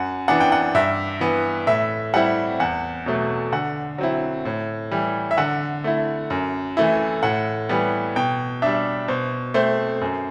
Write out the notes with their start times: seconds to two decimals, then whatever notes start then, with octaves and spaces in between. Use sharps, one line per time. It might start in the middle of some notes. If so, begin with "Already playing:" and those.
Already playing: F#2 F#5
0.28 E3 B3 D4 F#5
0.40 G5
0.52 F#5
0.74 G2 E5
1.21 E3 B3
1.67 A2 E5
2.14 G3 C4 E4 F#5
2.60 E2 F#5
3.06 B2 F#3 A3
3.52 D3 F#5
3.98 F#3 C4 E4
4.45 A2
4.91 E3 G3
5.31 E5
5.38 D3 F#5
5.84 A3 E4
6.30 F#2
6.77 E3 A3 E4
7.23 A2 F#5
7.69 E3 G3 B3
8.16 B2 G5
8.62 G3 D4 E5
9.08 B2 C5
9.54 A3 C4 C5
10.01 F#2